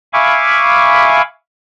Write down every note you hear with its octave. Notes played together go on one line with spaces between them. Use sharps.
E5 F5 G#5 B5 C#6 D6